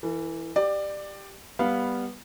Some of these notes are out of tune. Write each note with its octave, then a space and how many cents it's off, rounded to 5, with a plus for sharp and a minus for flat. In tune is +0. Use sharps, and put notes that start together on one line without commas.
E3 +0 A4 +45
G4 +0 D5 +20
G3 +10 B3 -10 F5 +0